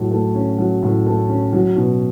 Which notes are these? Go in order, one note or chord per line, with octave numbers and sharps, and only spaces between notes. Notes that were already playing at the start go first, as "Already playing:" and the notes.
Already playing: A2 F#3
A3
C#4
F#3
A2
A3
C#4
F#3
B2